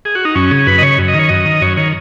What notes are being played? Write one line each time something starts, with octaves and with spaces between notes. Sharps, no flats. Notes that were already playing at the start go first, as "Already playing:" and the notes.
G#4
F#4
D#4
F#2 C#4
C#3 G#4
F#2 B4
D#5
C#3 C#5
F#2
D#5
D#3 C#5
F#2 D#5
D#3
F#2 C#5
D#3 C#5